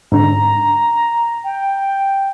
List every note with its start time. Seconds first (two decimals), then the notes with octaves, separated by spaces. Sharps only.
0.12 G#2 D3 A#5
1.44 G5